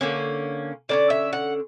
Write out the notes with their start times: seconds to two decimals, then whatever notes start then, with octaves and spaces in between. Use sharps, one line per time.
0.01 D3 A#3 C#4
0.89 D3 A#3 C#4 D5
1.10 E5
1.33 F#5